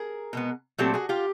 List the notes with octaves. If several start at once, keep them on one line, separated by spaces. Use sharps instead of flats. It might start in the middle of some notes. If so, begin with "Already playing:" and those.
Already playing: G#4 A#4
B2 G#3 B3
A#2 F#3 A3 C4 G4 A4
F#4 G#4
F4 G4